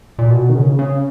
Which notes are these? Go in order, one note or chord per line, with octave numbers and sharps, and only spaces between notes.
A#2
B2
D#3
C#3
C#3